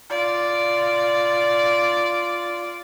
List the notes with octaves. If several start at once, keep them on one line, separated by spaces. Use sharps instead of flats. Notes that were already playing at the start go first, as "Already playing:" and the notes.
F4 D5